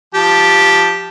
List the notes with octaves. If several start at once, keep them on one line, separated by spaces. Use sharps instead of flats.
F3 G4 A5